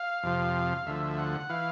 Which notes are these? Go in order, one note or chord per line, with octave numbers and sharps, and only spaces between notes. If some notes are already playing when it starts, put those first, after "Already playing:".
Already playing: F5
F2 C3 F3
D2 D3 F3 E5
F#5
E3 F5